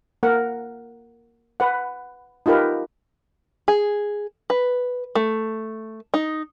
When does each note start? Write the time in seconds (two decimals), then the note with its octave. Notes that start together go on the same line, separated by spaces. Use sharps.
0.23 A#3 A#4 F#5
1.60 B4 F#5
2.46 D#4 F4 G4 A#4 B4
3.68 G#4
4.50 B4
5.15 A3
6.14 D#4